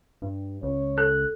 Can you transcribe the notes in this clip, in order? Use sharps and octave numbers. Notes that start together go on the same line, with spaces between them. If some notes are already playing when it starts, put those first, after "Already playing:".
G2
C#2 C#5
A4 F#6